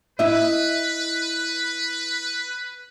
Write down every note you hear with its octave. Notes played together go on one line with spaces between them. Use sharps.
E4 B4 D#5 E5